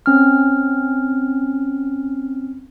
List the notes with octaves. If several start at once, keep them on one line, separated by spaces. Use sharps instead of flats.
C4 C#4 F6